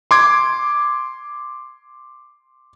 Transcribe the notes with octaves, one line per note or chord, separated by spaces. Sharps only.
C6 D6 G#6